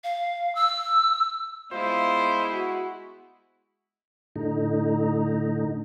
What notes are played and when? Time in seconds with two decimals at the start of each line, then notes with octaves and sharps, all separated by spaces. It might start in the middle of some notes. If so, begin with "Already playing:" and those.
0.04 F5
0.55 E6
1.72 G#3 B3 E4 F4 C5
2.51 F#4
4.36 A2 D3 D#4